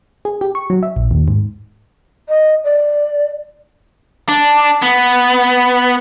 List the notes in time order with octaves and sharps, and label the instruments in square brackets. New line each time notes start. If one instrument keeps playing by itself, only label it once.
[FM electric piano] G#4
G4
C#6
F#3
E5
A#1
D#2
G#2
[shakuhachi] D#5
D5
[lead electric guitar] D4
B3